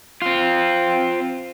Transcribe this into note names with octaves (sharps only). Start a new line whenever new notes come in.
C4 F4